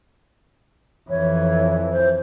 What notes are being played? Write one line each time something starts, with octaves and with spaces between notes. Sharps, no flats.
F2 E3 C#5
C5